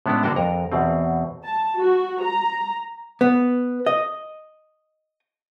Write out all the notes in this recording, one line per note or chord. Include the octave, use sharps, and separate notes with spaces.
A2 G#3 B3 C#4 D4 E4
D3 A#3 D4 F#4 G5 A5
F2 A#4 A#5
E2 B2 C4
A5
F#4
A#5
B3
D#5